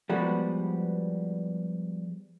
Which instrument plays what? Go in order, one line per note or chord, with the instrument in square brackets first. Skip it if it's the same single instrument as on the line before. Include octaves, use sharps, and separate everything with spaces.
[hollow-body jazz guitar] F3 G3 G#3 B3 F#4 B4